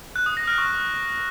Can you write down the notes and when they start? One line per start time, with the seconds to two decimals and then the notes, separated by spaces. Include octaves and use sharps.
0.16 F#6
0.26 D#6
0.37 A#6
0.47 F6
0.58 C#6